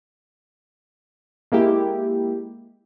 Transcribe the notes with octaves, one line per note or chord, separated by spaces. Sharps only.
G#3 A#3 E4 G4